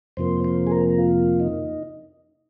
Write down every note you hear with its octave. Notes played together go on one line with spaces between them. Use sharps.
F2 C3 F3 A#3 C5
C5
G#4
A#4
F4
D#4